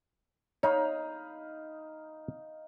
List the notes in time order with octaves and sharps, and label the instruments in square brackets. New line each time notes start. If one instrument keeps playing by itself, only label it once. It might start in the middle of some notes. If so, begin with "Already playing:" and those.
[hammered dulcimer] D#4 F5 B5 [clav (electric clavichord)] C#5